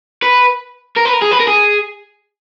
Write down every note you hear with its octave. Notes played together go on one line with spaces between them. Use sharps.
B4
A#4
B4
A#4
G#4
B4
A#4
G#4